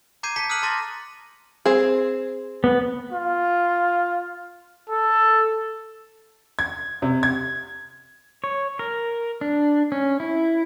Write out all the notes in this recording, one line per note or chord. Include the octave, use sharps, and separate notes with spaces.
A#5 D6 G6 G#6 C7 D#7
A5 B6 C#7
D#6 F6 F#6 B6 D#7 F#7
A5 A#5 C6 D6 A6 A#6
C4 G#4
B3
F4
A4
G#6
C3
G#6
C#5
A#4
D4
C#4
E4